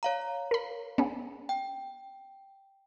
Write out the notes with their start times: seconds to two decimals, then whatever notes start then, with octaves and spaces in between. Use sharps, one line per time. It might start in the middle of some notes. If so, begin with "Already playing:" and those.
0.03 C#5 F5 A#5
0.51 A#4 B5
0.98 B3 C#4 G#4
1.49 G5